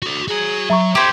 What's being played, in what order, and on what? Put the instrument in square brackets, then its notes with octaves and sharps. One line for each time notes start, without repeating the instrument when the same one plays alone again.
[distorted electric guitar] F#4 A4
[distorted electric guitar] F#4 A#5 [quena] G#4
[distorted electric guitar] F#3 [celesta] E5 A#5 C#6
[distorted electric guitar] C4 A4 [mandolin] G4 C5 [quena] G#6